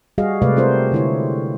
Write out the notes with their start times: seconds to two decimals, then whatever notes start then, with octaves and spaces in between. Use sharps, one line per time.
0.18 G3 F#4 G#4 D#5 F5
0.42 C3 G#3 A3 B4 D5 F5
0.57 C4 F4 A#4 C5
0.92 D3 E4 C#5